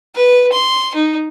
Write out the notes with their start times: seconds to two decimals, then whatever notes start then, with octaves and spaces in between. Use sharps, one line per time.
0.15 B4
0.52 C6
0.95 D#4